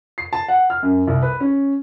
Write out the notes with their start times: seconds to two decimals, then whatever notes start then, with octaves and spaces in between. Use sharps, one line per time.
0.18 C7
0.33 A5
0.48 F#5
0.70 F6
0.83 F#2
1.07 C2
1.23 B4
1.40 C#4